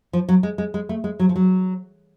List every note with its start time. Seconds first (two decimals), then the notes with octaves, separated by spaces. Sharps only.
0.13 F3
0.29 F#3
0.43 G#3
0.58 G#3
0.74 G#3
0.89 A3
1.04 G#3
1.19 F#3
1.29 F3
1.36 F#3